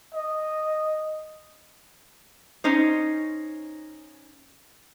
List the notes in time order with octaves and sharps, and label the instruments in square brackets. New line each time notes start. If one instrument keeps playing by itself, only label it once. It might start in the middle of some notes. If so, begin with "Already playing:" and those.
[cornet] D#5
[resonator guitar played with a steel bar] C#4 D#4 C5